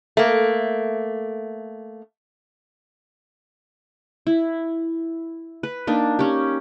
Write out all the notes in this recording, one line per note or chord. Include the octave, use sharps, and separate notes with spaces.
A3 A#3
E4
B4
A#3 D4 D#4
C#4 G4